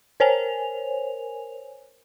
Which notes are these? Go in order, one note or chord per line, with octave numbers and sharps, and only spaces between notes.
A#4 C5 C#5 G#5 F7